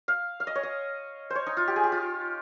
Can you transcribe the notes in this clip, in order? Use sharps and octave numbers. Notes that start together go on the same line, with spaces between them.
F5
F5
D#5
C#5
D#5
C5 C#5
D#4
F4
G4
G#4
G4
F4